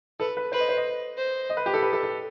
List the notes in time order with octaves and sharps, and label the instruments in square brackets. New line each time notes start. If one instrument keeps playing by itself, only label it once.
[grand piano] A4 [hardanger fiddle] B4
[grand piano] B4
[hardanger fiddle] B4 [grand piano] C5
[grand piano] D#5
C5
D#5
[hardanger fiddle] C5
[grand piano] D#5
B4
G4
A4
B4
A4
A4